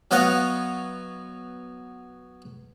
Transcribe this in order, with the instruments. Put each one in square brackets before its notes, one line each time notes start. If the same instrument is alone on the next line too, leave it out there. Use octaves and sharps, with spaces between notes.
[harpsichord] F#3 B3 C#5 D#5 F5 F#5